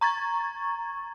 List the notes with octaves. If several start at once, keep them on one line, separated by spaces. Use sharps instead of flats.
A#5 C#6 G#6 A6